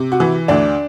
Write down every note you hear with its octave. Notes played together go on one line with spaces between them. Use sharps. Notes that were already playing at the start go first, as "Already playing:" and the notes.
Already playing: C3
F#4
E3
D2 D4